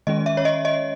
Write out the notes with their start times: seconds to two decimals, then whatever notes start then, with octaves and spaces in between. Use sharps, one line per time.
0.07 D#3 G#3 C#4 D#5
0.26 E5
0.37 C#5
0.45 D#5
0.65 D#5